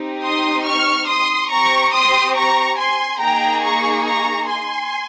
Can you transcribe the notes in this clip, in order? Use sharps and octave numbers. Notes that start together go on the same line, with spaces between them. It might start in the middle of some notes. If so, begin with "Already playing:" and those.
Already playing: C4 D#4 G4
C6 D#6
C#6 F6
C6 D#6
C4 G4 A#5 C#6
C6 D#6
A#5 C#6
G#5 C6
A#3 D#4 G#4 G5 A#5
A#5 C#6
A#5 C#6
G#5 C6